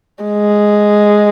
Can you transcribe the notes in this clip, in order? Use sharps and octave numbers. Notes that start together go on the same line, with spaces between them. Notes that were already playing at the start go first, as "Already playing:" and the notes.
G#3